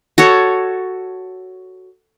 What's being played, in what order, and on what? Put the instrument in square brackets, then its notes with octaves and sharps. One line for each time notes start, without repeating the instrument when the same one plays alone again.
[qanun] F#4 A4 C#5